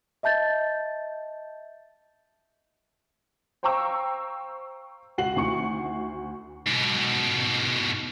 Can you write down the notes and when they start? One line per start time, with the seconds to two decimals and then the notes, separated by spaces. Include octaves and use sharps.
0.23 D#5 E5 A5 G6 A6
3.63 C5 F5 G5 A#5 C#6 E6
5.18 C#2 F#4 C7 F#7
5.36 D2 D#3 E4 F#4 C#6 C#7
6.67 G#2 B2